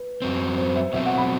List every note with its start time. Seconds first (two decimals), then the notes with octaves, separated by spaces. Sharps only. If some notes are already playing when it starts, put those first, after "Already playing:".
Already playing: B4
0.22 F#2 F#3 C4
0.58 C5
0.75 E5
0.93 B2 F#3 C4 E5
1.06 F#5
1.18 B5